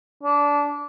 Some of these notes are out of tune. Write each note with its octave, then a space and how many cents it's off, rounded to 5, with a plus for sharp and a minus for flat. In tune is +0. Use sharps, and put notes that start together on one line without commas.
D4 -20